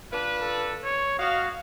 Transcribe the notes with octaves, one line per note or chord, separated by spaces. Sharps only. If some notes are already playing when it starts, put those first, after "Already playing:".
D4 F4 B4
A4
C#5
F#4 D#5 F5